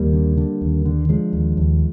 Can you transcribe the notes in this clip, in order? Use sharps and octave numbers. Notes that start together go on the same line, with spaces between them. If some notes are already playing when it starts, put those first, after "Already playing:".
Already playing: D#2 G3 A#3
D3
D3
D#2
D3
D3 F3 G#3
D#2
D#2